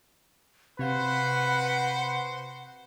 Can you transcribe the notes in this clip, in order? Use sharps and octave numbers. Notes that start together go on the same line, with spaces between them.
C3 F#4 B4 C5 F5 F#5